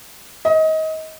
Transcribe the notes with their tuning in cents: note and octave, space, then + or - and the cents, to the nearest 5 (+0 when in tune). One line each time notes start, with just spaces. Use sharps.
D#5 +25